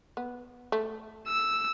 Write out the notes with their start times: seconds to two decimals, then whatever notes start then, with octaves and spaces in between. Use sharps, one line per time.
0.17 B3
0.72 A3
1.28 E6